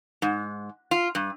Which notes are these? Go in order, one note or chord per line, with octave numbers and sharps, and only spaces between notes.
G#2
F4
G2